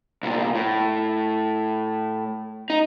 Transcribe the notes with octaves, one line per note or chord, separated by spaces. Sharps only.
C2 A#2
A2
D#4